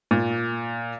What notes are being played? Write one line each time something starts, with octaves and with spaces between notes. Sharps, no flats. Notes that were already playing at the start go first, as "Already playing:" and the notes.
A#2